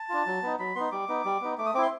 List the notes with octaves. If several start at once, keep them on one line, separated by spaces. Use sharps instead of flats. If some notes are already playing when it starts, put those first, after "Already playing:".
Already playing: A5
D4 F4
F#3
B3 D#4
F#3 B5
B3 D#4 C6
G3 D6
B3 D#4
G3
B3 D#4
A3 D6
D#6
C4 E4 C6 D6